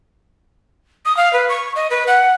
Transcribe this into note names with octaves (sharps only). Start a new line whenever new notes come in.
D#6
F5
B4
C#6
D#5
B4
F#5